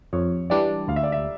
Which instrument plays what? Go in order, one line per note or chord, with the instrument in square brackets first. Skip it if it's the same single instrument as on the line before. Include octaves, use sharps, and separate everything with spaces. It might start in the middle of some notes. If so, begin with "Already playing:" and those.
[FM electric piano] F2 [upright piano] C#5
[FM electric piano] E3 G3 D4 [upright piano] D5
[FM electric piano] D2 [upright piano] F5
[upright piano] E5
D5
E5